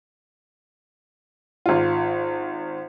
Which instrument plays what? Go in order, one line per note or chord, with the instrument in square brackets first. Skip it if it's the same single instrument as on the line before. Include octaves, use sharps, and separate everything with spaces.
[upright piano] G#1 F4